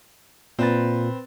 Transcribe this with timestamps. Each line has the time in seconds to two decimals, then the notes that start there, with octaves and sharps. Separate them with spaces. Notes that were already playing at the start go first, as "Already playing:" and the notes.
0.59 A#2 C4 B4 A6